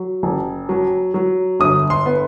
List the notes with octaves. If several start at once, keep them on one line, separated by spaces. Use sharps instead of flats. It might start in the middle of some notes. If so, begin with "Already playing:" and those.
Already playing: F#3
F#1
F#3
F#3
G1 D#6
C6
B3